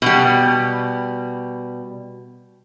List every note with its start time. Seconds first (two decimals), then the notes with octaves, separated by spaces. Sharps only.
0.02 B2 G3